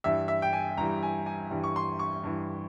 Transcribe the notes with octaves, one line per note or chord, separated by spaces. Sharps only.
G2 E3 G3 E5
E5
G5
G#5
G2 E3 G3 A#5
G#5
G#5
G2 E3 G3
C#6
C6
C#6
G2 E3 G3